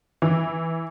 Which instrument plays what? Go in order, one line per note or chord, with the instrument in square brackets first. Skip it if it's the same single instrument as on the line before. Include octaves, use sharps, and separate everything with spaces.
[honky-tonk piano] E3